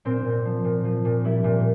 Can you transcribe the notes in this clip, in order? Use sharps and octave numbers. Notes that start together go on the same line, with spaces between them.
A#2 C4
A#2
F3
A#2
F3
A#2
G3 E4
A#2